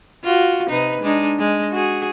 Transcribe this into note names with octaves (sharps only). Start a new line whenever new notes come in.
F4 F#4
C3 D#4 B4
G#3 D4 D#4
G#3
F#4 G#4